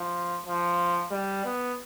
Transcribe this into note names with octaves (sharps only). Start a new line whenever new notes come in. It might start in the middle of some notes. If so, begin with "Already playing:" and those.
Already playing: F3
F3
G3
B3